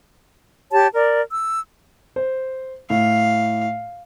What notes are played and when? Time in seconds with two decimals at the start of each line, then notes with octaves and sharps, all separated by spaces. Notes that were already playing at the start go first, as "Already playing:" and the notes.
0.72 G4 C#5 A5
0.93 A#4 D5
1.30 E6
2.16 C5
2.90 A2 F5